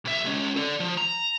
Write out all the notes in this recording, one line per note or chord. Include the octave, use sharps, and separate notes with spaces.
B1 E5
G#3 C#4
A4 D5
F3
A#5